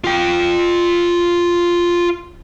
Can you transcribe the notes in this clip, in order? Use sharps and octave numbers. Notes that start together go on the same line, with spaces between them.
F4 G5